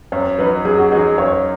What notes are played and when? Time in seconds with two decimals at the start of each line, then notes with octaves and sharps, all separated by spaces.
0.12 F#2 C#5
0.39 F#3 D#4 B4
0.65 F#2 G#4
0.78 F#4
0.92 F#3 D#4 G#4
1.18 F#2 C#5